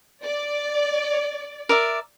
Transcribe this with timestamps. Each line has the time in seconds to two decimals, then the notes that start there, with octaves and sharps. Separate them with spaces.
0.24 D5
1.69 A#4 D5 E5